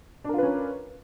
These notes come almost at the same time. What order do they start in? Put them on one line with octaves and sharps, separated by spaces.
D4 A#4 F4 B4 C#4